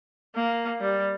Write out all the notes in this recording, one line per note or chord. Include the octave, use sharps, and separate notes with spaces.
A#3
G3